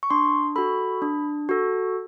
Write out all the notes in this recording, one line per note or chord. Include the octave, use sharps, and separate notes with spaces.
C#6
D4 C6
F#4 A4 B5
D4
F#4 A4